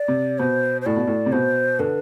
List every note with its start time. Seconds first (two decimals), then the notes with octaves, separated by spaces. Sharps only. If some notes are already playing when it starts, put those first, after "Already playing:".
Already playing: D5
0.08 C3
0.39 B2 C5
0.81 C5
0.86 A2 D5
0.96 B2
1.07 A2
1.26 C3
1.32 B2 C5
1.79 D3 B4